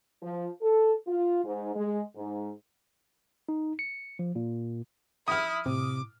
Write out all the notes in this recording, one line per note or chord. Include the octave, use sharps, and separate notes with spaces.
F3
A4
F4
G#2
G#3
G#2
D#4
C#7
F3
A#2
F3 D#4 E4 D#6 F6
A2 C3 D6